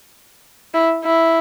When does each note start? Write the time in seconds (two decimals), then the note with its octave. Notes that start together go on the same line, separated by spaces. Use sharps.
0.74 E4
1.04 E4